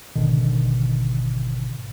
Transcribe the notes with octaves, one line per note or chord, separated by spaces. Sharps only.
G#1 B2 D3 D#3